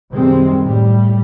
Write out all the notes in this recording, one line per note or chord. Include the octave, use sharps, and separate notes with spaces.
F#2 C3 D#3 G3 G#3 C4
A2 G3